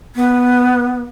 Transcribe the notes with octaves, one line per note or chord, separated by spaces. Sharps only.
B3